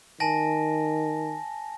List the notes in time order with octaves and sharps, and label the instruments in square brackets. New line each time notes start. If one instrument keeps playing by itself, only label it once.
[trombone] D#3 [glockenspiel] G#5 A5 A#6